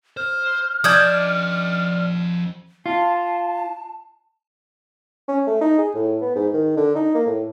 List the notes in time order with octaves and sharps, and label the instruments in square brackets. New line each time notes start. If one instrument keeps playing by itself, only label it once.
[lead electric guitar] C5 [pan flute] F6
[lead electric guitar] F3 D#5 [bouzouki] D4 D5 A5 [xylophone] D#6 G6 G#6
[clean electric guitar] F4 [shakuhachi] A5
[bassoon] C#4
A3
D#4
G#4
A2
B3
G#2
D#3
D3
D#4
A#3
A2